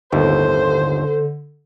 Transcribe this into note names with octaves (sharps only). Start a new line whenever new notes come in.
G1 D#2 A2 D3 C5